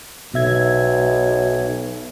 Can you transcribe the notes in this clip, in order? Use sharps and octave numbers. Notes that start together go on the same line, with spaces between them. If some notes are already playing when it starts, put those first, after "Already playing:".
B1 B2 E5 G#6